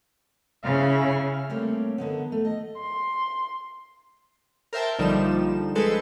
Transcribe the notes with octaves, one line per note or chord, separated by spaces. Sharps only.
C#3 E4 F5
G3 A3 A#3 C4 C#5
D3 D#3 B3
A3
D#5
C6
A#4 C5 E5 G5 A5
A#1 D3 F3 G3 D#4 E7
G#3 A4 B4 C5 C#7 E7